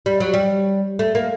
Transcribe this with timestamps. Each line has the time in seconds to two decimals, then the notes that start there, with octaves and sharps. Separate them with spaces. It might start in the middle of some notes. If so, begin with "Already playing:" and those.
0.06 G3
0.20 F#3
0.34 G3
0.99 A3
1.15 A#3